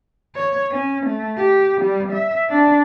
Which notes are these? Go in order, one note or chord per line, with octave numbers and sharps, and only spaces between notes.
C#5
C#4
A3
G4
G3
E5
D4